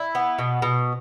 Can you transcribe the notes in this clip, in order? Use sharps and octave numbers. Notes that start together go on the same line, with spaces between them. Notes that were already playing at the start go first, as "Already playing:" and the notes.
Already playing: E4
B3
B2
B2